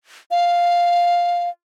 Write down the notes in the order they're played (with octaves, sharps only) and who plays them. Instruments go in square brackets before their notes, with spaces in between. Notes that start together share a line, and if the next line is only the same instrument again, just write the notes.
[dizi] F5